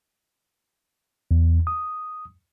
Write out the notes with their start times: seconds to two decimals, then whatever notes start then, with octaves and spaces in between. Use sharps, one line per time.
1.31 E2
1.67 D#6